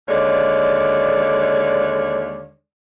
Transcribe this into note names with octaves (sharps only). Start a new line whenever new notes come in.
D#2 D3 G#3 C#5 D5